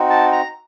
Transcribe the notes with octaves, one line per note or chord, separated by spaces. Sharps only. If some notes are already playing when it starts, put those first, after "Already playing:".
Already playing: C4 D#4 F#4
A5
A#5